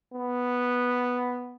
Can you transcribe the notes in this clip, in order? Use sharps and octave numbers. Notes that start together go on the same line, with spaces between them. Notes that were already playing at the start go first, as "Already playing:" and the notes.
B3